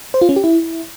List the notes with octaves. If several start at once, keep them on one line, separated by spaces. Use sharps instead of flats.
C5
F4
C#4
G4
E4